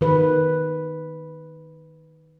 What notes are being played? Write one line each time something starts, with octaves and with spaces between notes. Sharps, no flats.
D#3 B4